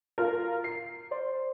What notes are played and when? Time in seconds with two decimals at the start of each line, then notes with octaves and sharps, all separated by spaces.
0.18 F4 A#4
0.64 C7
1.11 C5 D5 C6